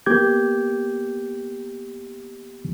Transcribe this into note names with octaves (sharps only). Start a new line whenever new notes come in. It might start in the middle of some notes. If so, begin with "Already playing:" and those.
A#3 B3 G4 D6 G6 G#6